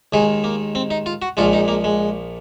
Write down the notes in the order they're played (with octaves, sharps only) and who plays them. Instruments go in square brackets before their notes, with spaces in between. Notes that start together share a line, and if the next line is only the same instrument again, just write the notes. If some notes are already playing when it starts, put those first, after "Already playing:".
[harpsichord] D#2 D#3 G#3 G#4
A#3
C4
D#4
F4
F#4
A#1 A#2 F3 G#3 F4
D#4
A#3
G#3